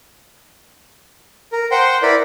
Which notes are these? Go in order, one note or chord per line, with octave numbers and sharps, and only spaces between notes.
A#4
C5 F#5 G5 C6
E4 A#4 B4 D5 B5